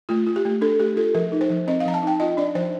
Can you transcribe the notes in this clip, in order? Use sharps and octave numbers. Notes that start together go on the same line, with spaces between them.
A3 F4
F4
G4
A3
D4 A4
A3 G4
F4 A4
F3 A#4
D#4
C5
F3
C4 D#5
F5
F3 A#5
A5
D#4
G5
F4 D#5
D4 D5
F3 C5